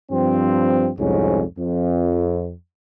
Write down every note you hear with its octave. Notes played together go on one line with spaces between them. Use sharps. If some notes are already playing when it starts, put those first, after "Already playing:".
G2 F3 C4
C2 F2 G#2 C#4
F2